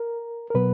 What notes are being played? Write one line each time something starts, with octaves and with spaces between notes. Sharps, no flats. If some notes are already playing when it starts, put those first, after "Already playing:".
Already playing: A#4
A#4
B2 F#3 B3 B4